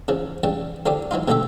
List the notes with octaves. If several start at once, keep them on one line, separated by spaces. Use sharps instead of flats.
C#3 E3 F3
C#3 E3 G3 A5
D3 F3 D4 G4 D#6
E3 F#3 D#4 F4
B2 D3 A3 G4 A4 E5